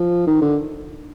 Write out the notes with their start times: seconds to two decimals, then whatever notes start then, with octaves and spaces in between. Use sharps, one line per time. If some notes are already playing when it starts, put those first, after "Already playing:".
Already playing: F3
0.27 D#3
0.41 D3